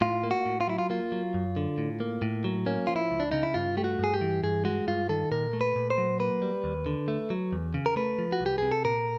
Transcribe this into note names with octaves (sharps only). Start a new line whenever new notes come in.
A2 F4
A#3
F#4
A2
F4
F#3 E4
F4
A#3 F4
F#3
F#2
D3
A2
A#3
A2
F#3
A#3 C#4
F3 F4
E4
C#2
D4
C#3 D#4
E4
G2 F4
A3 G4
F#4
G2 G#4
G4
E3
G2 G#4
G#3 F#4
G2 F4
D#3 A4
A#2 A#4
A3
B4
A#2
C5
F#3
A#3 B4
G3
D#2
D3
A3
F#3
E2
C#3
A#4
A3 B4
F3
F#4
C2
G4
C3 G#4
A4
A#2 A#4